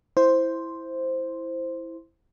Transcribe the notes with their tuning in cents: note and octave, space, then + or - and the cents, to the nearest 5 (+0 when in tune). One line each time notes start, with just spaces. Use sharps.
E4 +0 C5 +0